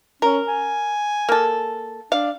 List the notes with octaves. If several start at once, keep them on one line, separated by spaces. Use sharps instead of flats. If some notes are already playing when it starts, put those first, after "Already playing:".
C#4 A#4
G#5
A#3 A4
D4 F5